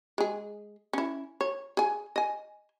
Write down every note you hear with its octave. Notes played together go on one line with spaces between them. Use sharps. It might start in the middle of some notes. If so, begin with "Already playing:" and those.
G#3 G#4
C#4 E4
C#5
G#4 G#5
D#5 G#5